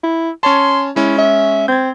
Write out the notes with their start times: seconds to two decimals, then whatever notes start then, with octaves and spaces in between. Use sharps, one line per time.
0.03 E4
0.43 C#4 C#5 A5 C6
0.96 G#3 C#4 E4
1.18 E5
1.68 C4 G6 G#6